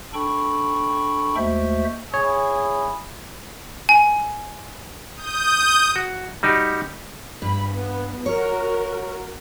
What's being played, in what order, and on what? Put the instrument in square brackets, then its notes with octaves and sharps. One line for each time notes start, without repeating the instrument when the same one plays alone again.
[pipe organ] D4 A4 G5 B5 C#6
D#2 G#3 A3 F#4 C5 E5
[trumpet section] E4 G#4 [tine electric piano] C#5
[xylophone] G#5
[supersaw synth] D#6 G6
[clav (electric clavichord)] F#4
G3 D#4 F#4 G4
[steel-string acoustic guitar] G2 [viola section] B5
[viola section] B3
[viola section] F#4 A#4 [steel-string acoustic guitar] C#5